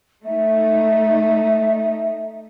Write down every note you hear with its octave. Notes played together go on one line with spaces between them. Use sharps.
A3 D#4 E5